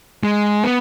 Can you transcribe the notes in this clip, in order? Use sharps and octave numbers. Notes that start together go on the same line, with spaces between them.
G#3
B3